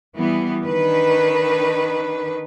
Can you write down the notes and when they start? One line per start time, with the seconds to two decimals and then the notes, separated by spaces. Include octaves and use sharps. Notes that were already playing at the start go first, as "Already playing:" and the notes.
0.15 E3 G3 B3
0.64 D#3 D4 B4